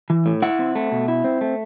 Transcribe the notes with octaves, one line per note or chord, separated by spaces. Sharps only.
E3
A2
E4 F#5
C4
A3
B2
E4
C4
A3